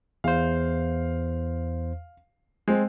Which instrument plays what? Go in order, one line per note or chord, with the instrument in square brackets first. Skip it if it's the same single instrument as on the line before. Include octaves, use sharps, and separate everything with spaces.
[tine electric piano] E2 C5 [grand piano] F5
[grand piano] G#3 C4